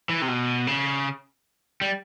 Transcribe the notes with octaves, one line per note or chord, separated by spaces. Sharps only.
E3
C3
B2
C#3
G3